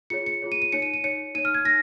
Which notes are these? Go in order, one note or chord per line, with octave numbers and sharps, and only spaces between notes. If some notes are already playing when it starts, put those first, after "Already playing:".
F4 G#4 C#5 C#7
C#7
F4 G#4 C#5
D#7
D#7
D#4 C#5 C#7
D#7
D#7
D#4 C#5 C#7
D#4 C#5 D#7
F6
G#6
D#4 A#6